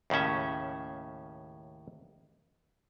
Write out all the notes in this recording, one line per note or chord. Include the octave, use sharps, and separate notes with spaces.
D#2 A2 C#3 C#4 E5